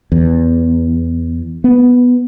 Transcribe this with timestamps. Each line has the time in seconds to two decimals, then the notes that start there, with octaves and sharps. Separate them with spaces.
0.12 E2
1.64 B3